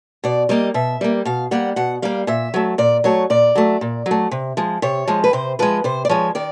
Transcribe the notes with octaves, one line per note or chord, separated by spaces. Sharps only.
B2 D5
G3 A#3 D#5
B2 E5
G3 A#3
B2 F5
G3 A#3 F#5
B2 F#5
G3 A#3 F5
A#2 E5
F#3 A3
A#2 D5
F#3 A3 C#5
A#2 D5
F#3 A3
A#2
F#3
A3
C3
F3 G#3
C3 C#5
F3 G#3
B4
C3 C5
F3 G#3 B4
C3 C5
D5
F3 G#3 C#5
D#3 D5